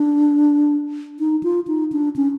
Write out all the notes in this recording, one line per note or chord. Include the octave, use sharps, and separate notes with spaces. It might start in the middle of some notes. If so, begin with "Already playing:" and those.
Already playing: D4
D#4
F4
D#4
D4
C#4